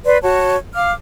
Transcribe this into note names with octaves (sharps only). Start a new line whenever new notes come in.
B4 D5 C6
F#4 C#5 A5
F5 D6 F6